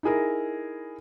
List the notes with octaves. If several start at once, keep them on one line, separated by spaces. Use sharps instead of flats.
D#4 E4 G#4 A#4